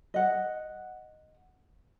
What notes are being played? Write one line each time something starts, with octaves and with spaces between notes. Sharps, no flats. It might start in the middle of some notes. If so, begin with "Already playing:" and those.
D#5 F#5